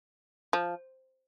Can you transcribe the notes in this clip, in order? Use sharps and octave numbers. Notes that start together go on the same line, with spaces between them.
F3